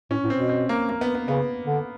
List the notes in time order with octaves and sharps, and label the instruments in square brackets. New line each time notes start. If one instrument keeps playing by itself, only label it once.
[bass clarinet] A2 [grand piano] C#4
[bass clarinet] A2
[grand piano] C4
[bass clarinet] B2
[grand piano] C4
A#3
A#3
B3
B3
[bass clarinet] C#3 [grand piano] B3
[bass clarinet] D3